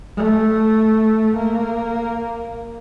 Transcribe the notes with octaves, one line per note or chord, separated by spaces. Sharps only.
A3
A#3